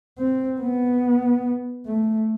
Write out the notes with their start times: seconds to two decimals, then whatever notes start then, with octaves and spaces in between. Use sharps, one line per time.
0.18 C4
0.60 B3
1.86 A3